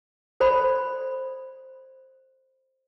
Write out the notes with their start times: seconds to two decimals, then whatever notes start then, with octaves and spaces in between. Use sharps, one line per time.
0.40 A4 C5 D5 B5 C6